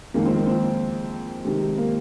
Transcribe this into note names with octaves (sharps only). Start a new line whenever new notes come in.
F2 D#3 G#3 A#3
C4
A#3
C4
C3 D#3 G#3
A#3